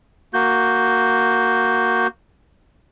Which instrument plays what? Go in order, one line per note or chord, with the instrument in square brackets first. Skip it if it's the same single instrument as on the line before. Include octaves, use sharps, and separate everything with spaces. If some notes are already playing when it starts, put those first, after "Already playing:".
[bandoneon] A#3 F#4 G6